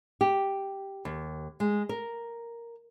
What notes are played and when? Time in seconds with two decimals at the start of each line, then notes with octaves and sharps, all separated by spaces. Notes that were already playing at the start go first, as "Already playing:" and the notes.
0.21 G4
1.05 D#2
1.60 G#3
1.89 A#4